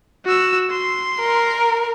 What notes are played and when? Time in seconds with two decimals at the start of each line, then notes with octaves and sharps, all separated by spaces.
0.25 F#4 E6
0.71 C6
1.20 A#4